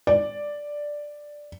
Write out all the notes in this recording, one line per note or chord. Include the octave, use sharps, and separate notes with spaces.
D5